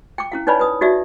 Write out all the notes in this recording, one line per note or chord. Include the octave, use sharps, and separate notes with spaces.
G5 D6
C#4 E4 F5
D#4 B4 C#5 D5 G#5 B5
B4 D#6
D#4 F#4 G4 D5 E5